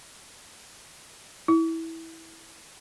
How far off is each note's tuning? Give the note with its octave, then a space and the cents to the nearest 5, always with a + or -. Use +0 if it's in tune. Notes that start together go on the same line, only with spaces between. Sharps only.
E4 -15